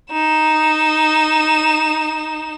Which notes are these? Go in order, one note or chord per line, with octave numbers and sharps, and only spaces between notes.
D#4 E7